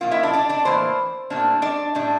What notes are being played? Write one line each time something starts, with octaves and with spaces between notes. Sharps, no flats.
A#2 F3 A#3 F4
E4 E5
D4 D5
D4 D5
D4 D5
A2 E3 A#3 C5
A2 G3 A#3 D4
D4 D5
A2 G3 D4